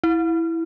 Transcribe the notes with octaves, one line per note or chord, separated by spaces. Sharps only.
E4